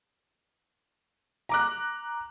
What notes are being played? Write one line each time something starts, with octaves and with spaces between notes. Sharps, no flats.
A#5 D6 F#6